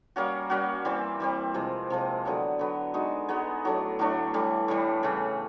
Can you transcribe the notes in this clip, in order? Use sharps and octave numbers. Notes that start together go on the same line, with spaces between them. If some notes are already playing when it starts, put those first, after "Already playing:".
G3 A#3 C#4 F#4
G3 A#3 C#4 F#4
E3 G3 C4
E3 G3 C4
C3 F3 G#3
C3 F3 G#3
D3 F#3 B3
D3 F#3 B3
G#3 B3 D#4 F#4
G#3 B3 D#4 F#4
A2 F#3 A3 D4
A2 F#3 A3 D4
A2 E3 G3
A2 E3 G3
C#3 E3 A3